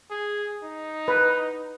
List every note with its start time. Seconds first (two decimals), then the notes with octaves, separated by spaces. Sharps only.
0.11 G#4
0.63 D#4
1.08 B4